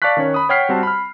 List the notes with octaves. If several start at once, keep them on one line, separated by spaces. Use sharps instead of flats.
D5 F5 A5 C#6 F#6 B6
D#3 C#4 C#5
B5 D#6
C#5 F#5 G5 F6 B6 C7
G3 C4 F#4 A5
B5 F6